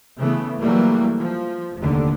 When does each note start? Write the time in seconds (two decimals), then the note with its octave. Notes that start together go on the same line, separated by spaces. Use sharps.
0.18 C#3 E3 A3 B3
0.58 E3 F#3 G3 A3 A#3
1.19 F3
1.77 F1 D#2 D3